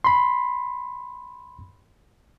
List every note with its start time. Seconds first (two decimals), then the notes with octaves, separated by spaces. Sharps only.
0.04 B5 C6